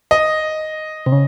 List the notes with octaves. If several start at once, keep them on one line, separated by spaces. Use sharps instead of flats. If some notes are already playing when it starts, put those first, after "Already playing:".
D#5
C3
C#3